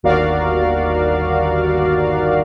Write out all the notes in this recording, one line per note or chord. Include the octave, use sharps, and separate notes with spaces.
G1 D#2 F#4 A#4 D5 F5